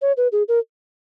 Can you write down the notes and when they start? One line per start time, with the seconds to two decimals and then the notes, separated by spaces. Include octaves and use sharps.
0.02 C#5
0.17 B4
0.32 G#4
0.48 A#4